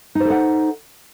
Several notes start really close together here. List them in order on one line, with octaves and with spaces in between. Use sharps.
D#4 C5 A4 F#5